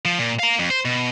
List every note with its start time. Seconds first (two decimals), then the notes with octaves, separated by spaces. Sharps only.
0.05 F3
0.19 A#2
0.39 F5 A#5
0.59 F2
0.70 C5
0.85 B2